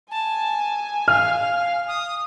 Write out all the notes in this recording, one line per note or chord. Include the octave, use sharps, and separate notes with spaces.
G#5 A5
F5 F6
D#6